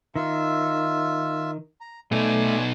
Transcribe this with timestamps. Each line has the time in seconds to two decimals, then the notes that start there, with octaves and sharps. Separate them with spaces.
0.16 D#3 F4 E5 E6
1.81 A#5
2.11 B2 A3 D#4 D5 G#5